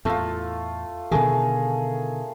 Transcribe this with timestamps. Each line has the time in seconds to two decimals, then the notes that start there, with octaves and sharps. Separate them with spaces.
0.05 E2 A2 A3 F4
1.11 B2 D3 D#3 A3 G#4 A#4